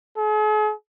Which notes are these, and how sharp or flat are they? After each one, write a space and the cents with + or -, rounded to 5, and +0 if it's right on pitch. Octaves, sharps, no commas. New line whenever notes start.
G#4 +45